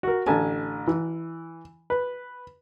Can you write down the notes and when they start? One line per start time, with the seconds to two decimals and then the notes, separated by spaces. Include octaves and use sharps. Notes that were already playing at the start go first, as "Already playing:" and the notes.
0.03 F#4 A#4
0.27 A1 D3 G#5 A5
0.88 E3
1.90 B4